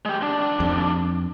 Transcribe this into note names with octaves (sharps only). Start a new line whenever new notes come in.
G#3 G4
D#2 D4
F2